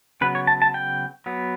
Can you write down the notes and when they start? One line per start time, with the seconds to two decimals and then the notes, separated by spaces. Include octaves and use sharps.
0.21 C#3 F#3 B3 B4
0.35 C#5
0.47 A5
0.62 A5
0.74 G5
1.26 F#3 B3